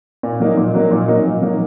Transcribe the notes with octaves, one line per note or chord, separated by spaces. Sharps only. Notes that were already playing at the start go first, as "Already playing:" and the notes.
A#2
F#3 A#3 D#4
A#2
F#3 A#3 D#4
A#2
F#3 A#3 D#4
A#2
F#3 A#3 D#4